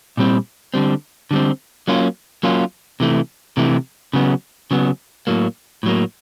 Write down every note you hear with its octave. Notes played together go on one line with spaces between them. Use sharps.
A#2 G3 C4
D3 G3 C4
D3 G3 C4
F#3 A#3 C#4 F4
F#3 A#3 C#4 F4
C3 E3 A3
C3 E3 A3
C#3 F#3 B3
C#3 F#3 B3
A2 F#3 A#3
A2 F#3 A#3